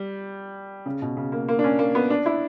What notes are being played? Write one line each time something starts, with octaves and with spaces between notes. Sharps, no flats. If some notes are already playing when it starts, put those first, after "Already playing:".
Already playing: G3
C#3
B2
C#3
A#3
A#3
D4
C#4
A#3
B3
D4
E4